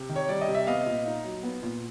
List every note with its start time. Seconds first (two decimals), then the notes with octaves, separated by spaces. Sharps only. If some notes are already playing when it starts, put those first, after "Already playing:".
Already playing: C3
0.09 D#3
0.16 C#5
0.29 G3 D5
0.41 D#5
0.48 C3
0.55 E5
0.67 B3 D#5 F5
0.86 A#2
1.06 D#4
1.24 F#3
1.43 B3
1.63 A#2